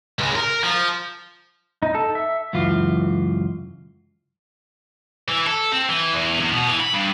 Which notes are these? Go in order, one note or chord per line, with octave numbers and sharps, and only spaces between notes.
C#2 G#3
A#4
F3
D#4
A4
E5
C#2 F#2 E3 F4
E3
A4
C4
E3
E2
E2
B2
E3
B5
G2